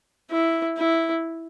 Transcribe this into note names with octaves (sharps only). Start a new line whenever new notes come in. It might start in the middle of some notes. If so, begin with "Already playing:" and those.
E4
E4